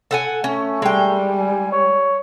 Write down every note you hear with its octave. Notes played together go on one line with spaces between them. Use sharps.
A4 F#5 G#5
A3 C#4
G3 G#3 G5
G#5
C#5